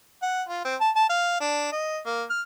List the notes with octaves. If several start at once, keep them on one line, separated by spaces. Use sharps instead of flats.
F#5
F4
C4
A5
A5
F5
D4
D#5
A#3
F6